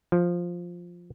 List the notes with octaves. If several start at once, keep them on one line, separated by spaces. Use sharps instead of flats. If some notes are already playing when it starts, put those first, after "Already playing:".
F3